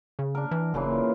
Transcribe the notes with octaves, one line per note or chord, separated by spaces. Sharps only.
C#3
D4 A#4
E3
F#1 A#2 C#3 E3